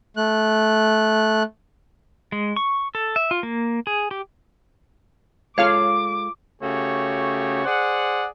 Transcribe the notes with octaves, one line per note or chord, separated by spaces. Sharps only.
A3 F#6
G#3
C#6
A4
E5
F4
A#3
G#4
G4
G#3 F4 A4 C#5 F5 D6 F6
C#3 A3 F#4 G4 C#5
G#4 C5 D5 F#5